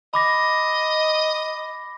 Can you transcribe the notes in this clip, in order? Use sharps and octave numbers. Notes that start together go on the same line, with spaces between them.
D#5 B5 D6 A#6